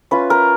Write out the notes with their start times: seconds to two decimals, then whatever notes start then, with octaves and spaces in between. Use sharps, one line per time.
0.11 C#4 F4 B4
0.30 A#4